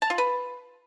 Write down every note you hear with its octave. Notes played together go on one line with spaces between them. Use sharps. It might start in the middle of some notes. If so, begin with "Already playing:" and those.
A5
F4
B4